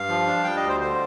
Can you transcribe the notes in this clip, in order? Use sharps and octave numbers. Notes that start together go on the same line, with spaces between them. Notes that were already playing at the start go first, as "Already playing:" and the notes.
Already playing: G2 F5
F3
D4
G3 G5
D#5
D2
C5
D3 C5